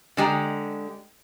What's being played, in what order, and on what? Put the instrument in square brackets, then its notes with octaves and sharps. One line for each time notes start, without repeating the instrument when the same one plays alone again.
[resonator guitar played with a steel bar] D3 G#3 G4 A#5